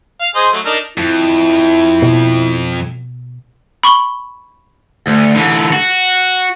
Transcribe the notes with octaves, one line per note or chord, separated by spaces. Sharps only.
F5
G#4 C5 D#5
F#3 A3
D4 D#4 A#4
F2 E4
B2
B5 C#6 F#7 G7
D2
D3 E3
F#4